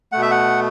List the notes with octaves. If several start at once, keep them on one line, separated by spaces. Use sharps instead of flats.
B2 A3 F#5
E5
F#5